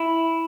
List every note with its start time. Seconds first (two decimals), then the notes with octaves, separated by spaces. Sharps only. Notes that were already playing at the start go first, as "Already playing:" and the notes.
Already playing: E4